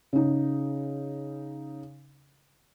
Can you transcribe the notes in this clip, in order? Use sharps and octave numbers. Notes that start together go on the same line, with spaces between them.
C#3 D#4